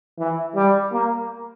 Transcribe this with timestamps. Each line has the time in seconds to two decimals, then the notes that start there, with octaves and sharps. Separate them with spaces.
0.19 E3
0.56 G3
0.92 A#3